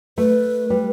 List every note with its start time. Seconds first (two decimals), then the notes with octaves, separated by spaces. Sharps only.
0.18 A3 B4
0.70 G3